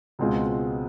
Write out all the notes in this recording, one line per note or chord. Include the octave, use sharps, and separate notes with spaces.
C#2 B2 G#3 C4 F4